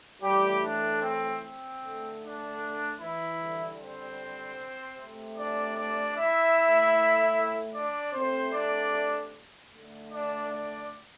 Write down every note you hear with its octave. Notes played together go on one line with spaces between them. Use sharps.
A2 E3 G3 A3 G4
D4
C4
C4
D3 A3
D4
E3 E4
D3 G3
C4 C5
C3 A3
D4 D5
D4 D5
E4 E5
A2 A3
D4 D5
C3 A3 C4 C5
D4 D5
D3 A3
D4 D5
D4 D5